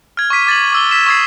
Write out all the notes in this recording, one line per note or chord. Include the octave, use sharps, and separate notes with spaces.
F6 G#6
C#6 D6 B6 D#7
D6 A6 D#7 F#7
D6 E6 G7
E6 F6 B6 E7
C#6 D#6 G#6 A6 C7